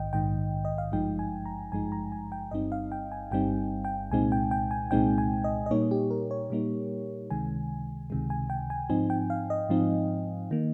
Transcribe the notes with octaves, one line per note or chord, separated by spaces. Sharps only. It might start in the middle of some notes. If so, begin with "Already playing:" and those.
Already playing: A#1 G#2 D#3 D#5 G5
A#1 G#2 D#3 G5
D#5
F5
G#1 G2 F3 G#3 D#4 G5
G#5
A#5
G#1 G2 F3 G#3 D#4 G#5
A#5
G#5
G5
G1 G2 G3 C4 D#4 D#5
F5
G5
G#5
G1 G2 G3 C4 D#4 G5
G5
C2 A#2 G#3 C4 D#4 G#5
G5
G5
G#5
C2 A#2 G#3 C4 D#4 G5
G#5
D#5
D#5
A#2 G3 A#3 D#4 C#5
G4
A#4
C#5
A#2 G3 A#3 D#4
C#2 C3 D#3 G#3 G#5
C#2 C3 D#3 G#3
G#5
G5
G#5
G#2 F3 C4 D#4 G#5
G5
F5
D#5
G#2 F3 C4 D#4
D#3 A#3